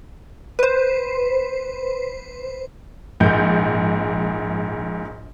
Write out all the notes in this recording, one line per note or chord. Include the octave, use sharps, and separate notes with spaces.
B4 C5
A#1 G#2 G6